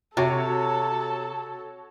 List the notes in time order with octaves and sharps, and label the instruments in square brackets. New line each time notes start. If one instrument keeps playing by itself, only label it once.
[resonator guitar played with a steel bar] C3 [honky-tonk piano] F#4 C#5 [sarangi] A4 [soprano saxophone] A5